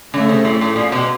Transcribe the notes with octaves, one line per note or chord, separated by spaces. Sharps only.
C#3 A3
C3
A2
A2
A#2
B2